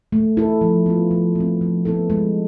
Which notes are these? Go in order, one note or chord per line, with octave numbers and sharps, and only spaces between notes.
A3
E4 A4
F3
B3 F4
F3
A3 C4
F3
B3 E4 A4
G#3